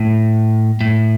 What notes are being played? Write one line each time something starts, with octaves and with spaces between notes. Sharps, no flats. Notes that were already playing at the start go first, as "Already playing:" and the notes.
Already playing: A2
A2